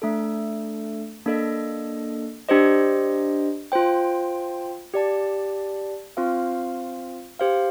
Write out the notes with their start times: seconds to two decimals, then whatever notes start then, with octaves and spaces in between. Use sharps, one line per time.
0.02 A3 D4 A4
1.26 A#3 D4 A4 D#5
2.49 D4 G4 C5 D#5
3.72 F4 C5 G5
4.93 G4 D5 A5
6.17 C4 F4 C5 F5
7.39 G4 C5 F5